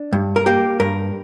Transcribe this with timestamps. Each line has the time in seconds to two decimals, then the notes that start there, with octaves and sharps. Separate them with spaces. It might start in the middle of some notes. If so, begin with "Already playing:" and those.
Already playing: D4
0.13 G2
0.36 A#4
0.46 A#3 G4
0.80 G2 A#4